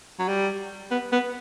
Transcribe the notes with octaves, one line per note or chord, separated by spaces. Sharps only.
F#3
G3
B3
B3